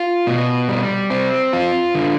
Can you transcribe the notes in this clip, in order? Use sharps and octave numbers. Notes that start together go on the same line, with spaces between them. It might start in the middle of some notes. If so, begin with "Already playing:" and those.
Already playing: F4
B2
G3
C4
F4
D3